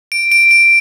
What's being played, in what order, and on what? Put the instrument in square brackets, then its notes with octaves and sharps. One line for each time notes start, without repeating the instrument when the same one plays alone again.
[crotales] D7
D7
D7